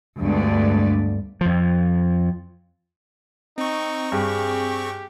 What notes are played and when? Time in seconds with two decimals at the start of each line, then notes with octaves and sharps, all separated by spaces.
0.19 D2 G2 G#3 A3 B3 D5
1.41 F2 F3
3.58 C4 D#4 C#6
4.12 G2 G4 G#4